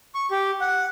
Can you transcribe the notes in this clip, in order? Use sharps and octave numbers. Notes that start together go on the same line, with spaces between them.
C#6
G4
F#5